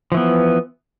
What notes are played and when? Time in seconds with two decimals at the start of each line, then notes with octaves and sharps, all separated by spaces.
0.12 F3
0.14 E3
0.17 B3